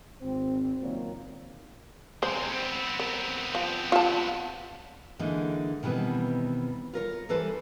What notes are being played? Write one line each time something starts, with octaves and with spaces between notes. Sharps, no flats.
G#1 C4
C#2 A#2 D#3 F#3 A#3
C3 G#3 C5
B3 C4
A#4
F3
F4 A5
D3 E3 G#3 A#3 D#4
B2 D#3 E3 G3 B3 C4
F4 A#4 C#5
E3 G3 A4 B4 C5